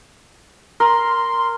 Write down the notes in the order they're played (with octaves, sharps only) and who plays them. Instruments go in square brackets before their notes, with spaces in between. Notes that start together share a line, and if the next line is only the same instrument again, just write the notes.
[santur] A#4 [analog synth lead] C6